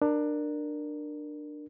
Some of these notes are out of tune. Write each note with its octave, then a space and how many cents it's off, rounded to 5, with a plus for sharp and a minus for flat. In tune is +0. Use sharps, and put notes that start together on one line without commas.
D4 +20 A#4 +0